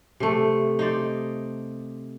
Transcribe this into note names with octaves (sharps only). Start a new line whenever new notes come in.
C3 A3
D#4 C5 D5